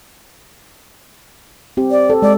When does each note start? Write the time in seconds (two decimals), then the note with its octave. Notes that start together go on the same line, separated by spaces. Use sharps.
1.77 C4 G4
1.91 D5
2.10 A4
2.22 G#3 D5